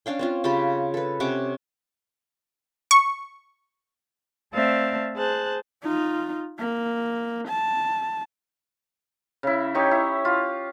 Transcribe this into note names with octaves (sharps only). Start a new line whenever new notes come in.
C#4 D4 F5 G5
C4 C#4 F4
C#3 F4 G4 B5
A4 B4
C3 C#4 F#5 D6
C#6
A3 C4 D5 E5 F5 A5
G#4 C5 A5 F#6
D#4 F4
A#3
A5
C#3 E4
D#4 G4 C#5
E4
F4